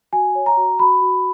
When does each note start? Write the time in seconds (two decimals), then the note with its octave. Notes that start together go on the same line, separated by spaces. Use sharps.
0.13 F#4 G#5
0.35 C#5
0.46 A#5
0.57 F#4
0.79 F#4 B5
1.02 F#4